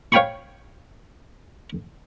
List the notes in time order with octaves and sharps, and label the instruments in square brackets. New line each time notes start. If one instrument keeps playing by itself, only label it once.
[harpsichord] C#5 F5 G5 G#5 B5 C#6